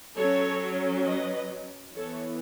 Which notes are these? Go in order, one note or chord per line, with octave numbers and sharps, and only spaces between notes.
F#3 C#4 A4 C#5
B4 D#5
E3 B3 A4 C#5